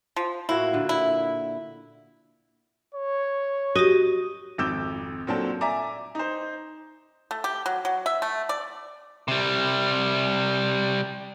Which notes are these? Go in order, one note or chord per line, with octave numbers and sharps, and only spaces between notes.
F3
A2 A#3 E4 F#4
A#2 D3
E4
C#5
F#4 G4 D#5
G#1 F2 D6 E6 G6 E7
A#2 F#3 C4 D4 A4
D5 E5 G#5 A#5 D6
D#4 C5
A3
G4
F#3
F#3
E5
A3
D5
C3 G3